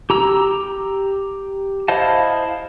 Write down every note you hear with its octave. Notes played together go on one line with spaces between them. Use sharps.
G4 A#5 E6
E4 C5 D#5 F5 A5